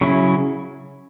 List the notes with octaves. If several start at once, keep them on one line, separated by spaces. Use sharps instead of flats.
C#3 F#3 C#4 E4